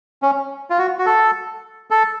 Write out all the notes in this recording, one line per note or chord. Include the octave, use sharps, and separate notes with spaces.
C#4
F4
F#4
F#4
A4
A4